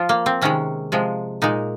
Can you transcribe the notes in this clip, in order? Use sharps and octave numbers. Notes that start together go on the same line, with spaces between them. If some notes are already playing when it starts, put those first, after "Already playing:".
Already playing: F3 F4
A#3
C4
C3 D#3 G#3 C#4
C3 F3 G#3
A#2 G#3 D#4